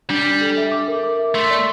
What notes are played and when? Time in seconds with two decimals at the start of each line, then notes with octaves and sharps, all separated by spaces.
0.10 G3 D4
0.26 D4
0.41 A4
0.57 E5
0.72 D6
0.88 A#4
1.03 D6
1.19 E5
1.34 A3 C6
1.50 D5